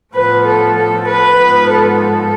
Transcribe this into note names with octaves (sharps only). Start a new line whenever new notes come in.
A2 F3 B3 B4
A4
A4
B4
G#2 F3 B3
A4
A4